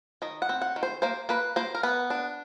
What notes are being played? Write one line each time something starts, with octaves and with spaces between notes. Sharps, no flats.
D#3 D#5
F#5
C4
F#5
D#3
C5
A#3 C5
A#3 B4
A#3 C5
A#4
B3 B4
D4